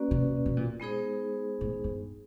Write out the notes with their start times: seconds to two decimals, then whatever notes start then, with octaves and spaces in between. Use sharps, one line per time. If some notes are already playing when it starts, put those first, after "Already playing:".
Already playing: A#3 C#4 F#4 B4 D5
0.11 C3
0.46 B2
0.57 A#2
0.80 G#3 B3 D#4 G#4 C5
1.61 A2
1.84 G2